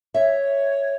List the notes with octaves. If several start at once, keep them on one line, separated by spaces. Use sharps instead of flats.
C#5 E5